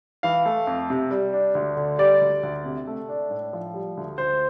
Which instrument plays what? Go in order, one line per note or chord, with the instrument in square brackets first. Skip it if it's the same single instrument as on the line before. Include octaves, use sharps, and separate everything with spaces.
[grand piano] E3 F5
A3
F2
C3
G3
D4
D2
D3
G3 D5
D2
D2
C3
A3
D4
A2
F3
G3
D2
D2 C5